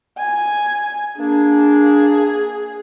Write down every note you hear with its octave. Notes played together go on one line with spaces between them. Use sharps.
G#5
A#3 D4 G#4